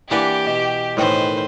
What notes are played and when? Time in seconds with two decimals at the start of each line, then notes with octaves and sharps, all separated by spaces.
0.11 E3 A#3 D4 G4 F#5 G#5
0.47 B2
0.97 A2 D#3 E3 B4 C5